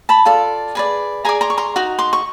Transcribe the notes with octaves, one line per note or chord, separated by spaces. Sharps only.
A5 B5
F4 A4 D5
G#4 B4 D5
G#4 B4 D5 G#5 A#5
A#5 C6
C#6
A#5 C6
D#4 F#4
C6 D6
C#6